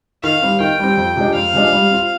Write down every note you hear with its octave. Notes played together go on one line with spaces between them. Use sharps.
D#3 F5
G3 C4
D#3 G5
G3 C4
F2
C3 F3 G#3 D4
F2 F5
C3 F3 G#3 D4
G3
C4 F4